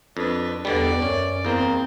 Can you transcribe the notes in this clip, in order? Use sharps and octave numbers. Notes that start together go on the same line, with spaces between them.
F2 D4 B4
E2 B2 D3 G3 D5
F#2 C#4
E2 A#3 C4